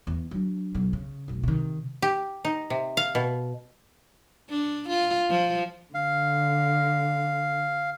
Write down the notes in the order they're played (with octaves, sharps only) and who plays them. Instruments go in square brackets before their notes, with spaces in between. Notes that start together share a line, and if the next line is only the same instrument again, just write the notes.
[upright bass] E2
F#3 D4
B1 F#3
C#3
F1 B1
C3 D#3
[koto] G4
D#4
C3
F5
B2
[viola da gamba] D4
F4
F3
[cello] D3 [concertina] F5